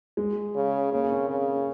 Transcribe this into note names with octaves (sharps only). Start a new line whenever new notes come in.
G#3
C#3
C#3 A#3
A#3
C4
C#3
C4